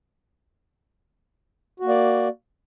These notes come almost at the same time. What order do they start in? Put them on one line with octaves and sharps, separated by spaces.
F#4 A#3 D5